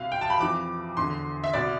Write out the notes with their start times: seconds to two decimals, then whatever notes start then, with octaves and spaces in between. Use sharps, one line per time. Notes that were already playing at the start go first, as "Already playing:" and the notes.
Already playing: C2 B2 F5
0.12 G5
0.21 A5
0.30 B5
0.39 F2 E3 D6
0.97 E2 D3 C6
1.44 E5
1.54 C2 B2 D5